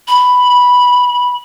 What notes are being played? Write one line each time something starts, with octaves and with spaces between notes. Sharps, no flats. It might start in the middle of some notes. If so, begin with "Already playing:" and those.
B5